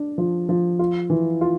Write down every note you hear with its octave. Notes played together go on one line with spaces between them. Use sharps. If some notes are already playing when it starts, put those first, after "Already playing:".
Already playing: D4
F3
F3
F4
E3
F4